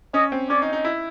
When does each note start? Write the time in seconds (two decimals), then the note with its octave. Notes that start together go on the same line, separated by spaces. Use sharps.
0.14 C#4 D#5
0.32 C4
0.50 C#4 D5
0.62 D#4
0.73 D#4
0.85 E4